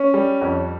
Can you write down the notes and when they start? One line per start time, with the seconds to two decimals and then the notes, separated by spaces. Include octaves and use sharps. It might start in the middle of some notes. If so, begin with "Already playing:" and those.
Already playing: C#4
0.14 G3
0.41 F2